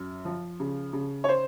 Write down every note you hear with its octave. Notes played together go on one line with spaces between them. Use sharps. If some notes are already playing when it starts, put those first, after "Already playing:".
Already playing: F#2
F3
C#3
C#3
C#5
C5